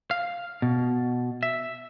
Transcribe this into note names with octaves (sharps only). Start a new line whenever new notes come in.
F5
B2
E5